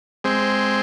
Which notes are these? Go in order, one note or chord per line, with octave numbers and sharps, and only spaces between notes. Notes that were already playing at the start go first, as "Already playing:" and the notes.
G#3 C4